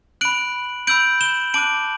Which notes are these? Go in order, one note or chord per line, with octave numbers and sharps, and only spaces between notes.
B5 F#6 D7 F#7
B5 E6 G6 D7 F#7
E7 G7
A5 D6 F#6 D7 F#7